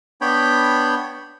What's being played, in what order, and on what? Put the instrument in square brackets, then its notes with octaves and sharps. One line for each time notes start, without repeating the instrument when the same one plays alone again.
[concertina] B3 D4 C#5 G5 B5